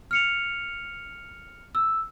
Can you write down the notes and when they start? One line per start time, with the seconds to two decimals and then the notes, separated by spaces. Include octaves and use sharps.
0.11 F6 C#7 F7
1.75 E6